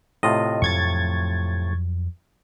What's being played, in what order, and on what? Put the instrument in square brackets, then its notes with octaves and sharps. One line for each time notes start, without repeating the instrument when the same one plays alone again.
[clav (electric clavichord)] A2 C3 F4 [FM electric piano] D#5
[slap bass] F2 F3 F#3 [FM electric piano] C#6 G#6 A6